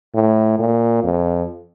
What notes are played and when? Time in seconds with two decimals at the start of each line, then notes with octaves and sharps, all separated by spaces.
0.15 A2
0.59 A#2
1.04 F2